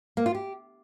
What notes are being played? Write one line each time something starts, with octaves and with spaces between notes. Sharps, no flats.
A#3
F4
G4